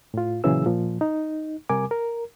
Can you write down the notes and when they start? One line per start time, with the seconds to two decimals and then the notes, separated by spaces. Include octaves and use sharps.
0.14 A2 F4
0.44 A#2 C#3 E3 F#3 G#4 E6
0.66 A#2 F3
1.01 D#4
1.69 C3 G3 A#4 G#5 D6
1.91 A#4